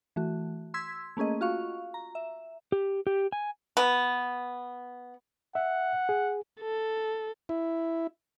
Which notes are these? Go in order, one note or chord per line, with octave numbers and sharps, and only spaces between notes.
E3 A3 F#4
C6 E6 G#6 B6
A3 A#3 C#4 G#4 D#5
F4 F#4 F5 C#6
A#5
E5
G4
G4
G#5
B3
E5 F#5
G#4
A4
E4